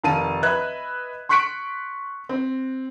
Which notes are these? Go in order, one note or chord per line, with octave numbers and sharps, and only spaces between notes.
F1 D#3 F5 A5 D#7
B4 D#5 E5 F#6 G#6
C6 C#6 F#6 B6 C#7 D7
C4